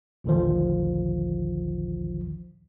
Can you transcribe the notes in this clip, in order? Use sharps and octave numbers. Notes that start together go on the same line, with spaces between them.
A1 D#2 A#2 D3 D#3 F3